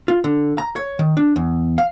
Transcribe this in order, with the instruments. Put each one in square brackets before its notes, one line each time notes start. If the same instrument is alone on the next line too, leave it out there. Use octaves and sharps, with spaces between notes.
[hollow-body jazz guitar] F4
D3
A#5
C#5
D#3
D4
E2
F5